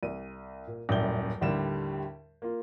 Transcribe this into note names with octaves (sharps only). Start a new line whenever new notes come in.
C2 D#7
A#2
D#1 F#2 A2 D5 G6 G7
D#2 A2 D3 G3 G4 E7
A#3 F4